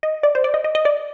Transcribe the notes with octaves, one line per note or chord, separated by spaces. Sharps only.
D#5
D5
C5
D5
D#5
D#5
D#5
D5